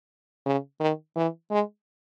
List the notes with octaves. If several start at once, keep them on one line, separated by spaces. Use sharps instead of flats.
C#3
D#3
E3
G#3